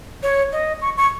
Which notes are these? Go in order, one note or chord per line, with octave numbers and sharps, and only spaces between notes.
C#5
D#5
C#6
C#6